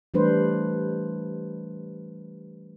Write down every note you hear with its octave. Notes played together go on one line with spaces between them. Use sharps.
E3 G3 A3 D4 B4 C5